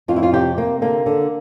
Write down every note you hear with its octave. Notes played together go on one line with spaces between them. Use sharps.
F2 F4
E4
F4
C3 G4
C3 A#3
D3 A#3
D3